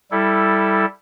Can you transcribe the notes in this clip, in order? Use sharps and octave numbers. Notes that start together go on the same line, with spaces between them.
G3 E4 A4